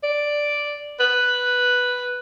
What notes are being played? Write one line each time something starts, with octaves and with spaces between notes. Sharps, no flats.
D5
B4